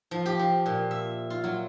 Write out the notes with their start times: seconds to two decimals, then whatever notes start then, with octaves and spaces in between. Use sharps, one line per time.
0.11 F3
0.26 G4
0.39 F3
0.66 A#2
0.91 E5
1.30 F4
1.44 F#3